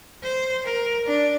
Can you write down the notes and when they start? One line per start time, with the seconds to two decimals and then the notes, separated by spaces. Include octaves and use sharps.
0.23 C5
0.64 A#4
1.06 D4